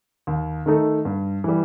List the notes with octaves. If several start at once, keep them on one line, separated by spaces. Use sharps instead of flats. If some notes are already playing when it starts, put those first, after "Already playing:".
D#2
D#3 A3 D#4 A4
G2
E3 G3